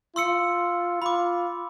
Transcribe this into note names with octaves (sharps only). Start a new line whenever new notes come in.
F4 C6 E6 C#7
F4 B5 D6